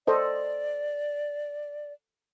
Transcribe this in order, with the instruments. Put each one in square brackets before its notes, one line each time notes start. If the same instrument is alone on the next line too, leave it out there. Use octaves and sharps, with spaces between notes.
[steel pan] A4 C5 D#5 [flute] D5